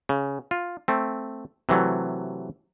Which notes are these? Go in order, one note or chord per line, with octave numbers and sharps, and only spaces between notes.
C#3
F4
A3 C4
C3 E3 F#3 A3